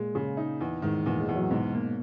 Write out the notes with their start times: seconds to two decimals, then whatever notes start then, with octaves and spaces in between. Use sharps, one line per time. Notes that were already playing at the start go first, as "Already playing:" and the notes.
Already playing: A#2 G#3
0.15 C#3
0.37 D#4
0.61 E2
0.82 G#2 D#3
1.06 E2 A#2
1.20 G#3
1.28 E2
1.36 F#3
1.51 G#2 B2
1.74 A#3